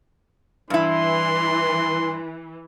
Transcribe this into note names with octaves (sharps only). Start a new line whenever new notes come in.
G2 E3 E4 C6